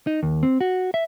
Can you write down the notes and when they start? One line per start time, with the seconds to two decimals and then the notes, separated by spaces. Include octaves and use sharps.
0.07 D#4
0.23 D#2
0.43 C4
0.61 F#4
0.94 E5